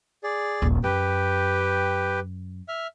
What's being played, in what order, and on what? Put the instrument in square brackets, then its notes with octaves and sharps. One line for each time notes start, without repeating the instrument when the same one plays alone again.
[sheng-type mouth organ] G#4 D5
[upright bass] D#1 A#1
[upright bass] F#2 [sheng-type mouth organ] G4 B4 G5
[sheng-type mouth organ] E5 F6